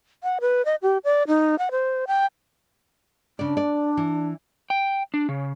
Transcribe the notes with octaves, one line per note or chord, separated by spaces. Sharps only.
F#5
B4
D#5
G4
D5
D#4
F#5
C5
G5
C#3 D4 D5
D5
E3
G5
D4
C#3